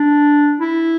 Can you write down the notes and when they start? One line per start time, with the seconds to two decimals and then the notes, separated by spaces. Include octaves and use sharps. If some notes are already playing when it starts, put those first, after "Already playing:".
Already playing: D4
0.61 E4